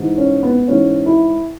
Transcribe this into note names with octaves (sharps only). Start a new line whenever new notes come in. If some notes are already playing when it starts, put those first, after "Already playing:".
Already playing: G#2 E3
C#4
B3
G#2 E3 C#4
E4